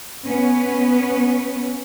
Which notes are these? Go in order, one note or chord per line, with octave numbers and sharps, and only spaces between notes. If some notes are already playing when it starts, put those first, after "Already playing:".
B3 C#4